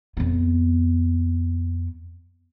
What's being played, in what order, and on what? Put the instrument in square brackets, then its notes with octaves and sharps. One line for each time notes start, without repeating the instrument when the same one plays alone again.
[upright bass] F2 B3